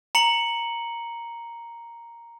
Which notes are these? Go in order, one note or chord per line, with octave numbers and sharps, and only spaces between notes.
A#5 C#7 F#7